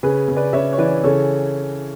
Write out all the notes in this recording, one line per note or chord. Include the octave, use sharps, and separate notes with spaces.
C#3 G#4 B4
C#3
B4 D5
C#3 C#5 E5
C#5
E3 B4 D5
C#3 A4 C#5